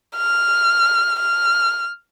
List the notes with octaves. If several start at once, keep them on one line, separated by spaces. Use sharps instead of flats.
F6
F6